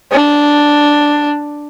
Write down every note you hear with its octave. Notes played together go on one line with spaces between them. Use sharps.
D4